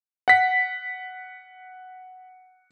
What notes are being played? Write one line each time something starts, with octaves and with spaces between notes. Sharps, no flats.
F#5 B6